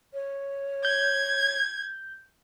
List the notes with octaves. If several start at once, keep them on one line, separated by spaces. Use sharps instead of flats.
C#5
G6 G#6